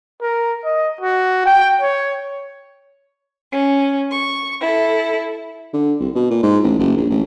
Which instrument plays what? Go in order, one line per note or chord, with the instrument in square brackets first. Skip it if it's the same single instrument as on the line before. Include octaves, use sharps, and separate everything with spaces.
[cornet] A#4
D#5
F#4
G5
C#5
[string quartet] C#4
C#6
E4 A4
[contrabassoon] D3
C2
B2
A#2
G#2
A1
F#1
A#1
A1